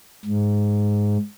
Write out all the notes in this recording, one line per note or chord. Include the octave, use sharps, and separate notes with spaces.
G#2